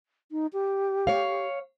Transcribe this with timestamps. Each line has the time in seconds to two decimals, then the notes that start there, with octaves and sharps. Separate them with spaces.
0.31 D#4
0.53 G4
1.07 C#5 F5